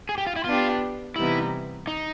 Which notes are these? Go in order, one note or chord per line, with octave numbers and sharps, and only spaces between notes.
G#4
G4
F4
E4
B3 D4 F4 G4
C3 E3 G3 B3 D#4 E4
D#4